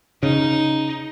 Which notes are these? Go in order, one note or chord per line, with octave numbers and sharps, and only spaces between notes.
C#3 D#4